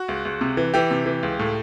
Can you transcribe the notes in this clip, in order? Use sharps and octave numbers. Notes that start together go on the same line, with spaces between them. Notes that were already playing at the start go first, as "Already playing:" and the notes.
Already playing: F#4
C#2
C#2
C3
E3
E3 G4
C3
E3
C#2
A2